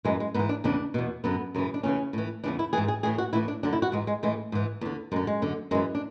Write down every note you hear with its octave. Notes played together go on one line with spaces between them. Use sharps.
F#2 E3 G#3
G#3
G#2 E3 B3
D4
E2 C#3 E3 D4
E2 B2
F#2 D3 B3
F#2 C#3 E3
D4
E2 C#3 E3 C#4
A2 E3
E2 C#3 E3 D4
E4
G#2 E3 G#4
G#4
A2 E3 G#4
F#4
A2 E3 E4
D4
F#2 D3 D4
E4
F#4
G#2 E3 G#3
G#3
A2 E3 G#3
G#2 E3
E2 D3
F#2 D3 G#3
G#3
F#2 D3
F#2 E3 G#3
D4